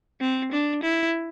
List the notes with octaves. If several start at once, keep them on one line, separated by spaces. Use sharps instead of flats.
C4
D4
E4